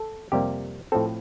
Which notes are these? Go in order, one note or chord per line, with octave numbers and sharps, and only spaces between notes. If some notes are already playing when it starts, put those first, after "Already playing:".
Already playing: A4
F2 C3 G3 A#3 G4
A2 F3 C4 A4